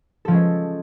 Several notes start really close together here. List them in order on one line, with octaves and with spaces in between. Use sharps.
A4 F3 C#4 G#3